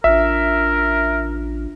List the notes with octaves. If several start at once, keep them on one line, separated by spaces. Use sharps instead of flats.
A1 D4 F4 A#4 E5